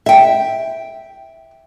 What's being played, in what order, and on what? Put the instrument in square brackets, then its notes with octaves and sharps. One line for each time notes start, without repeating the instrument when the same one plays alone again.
[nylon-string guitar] E5 G5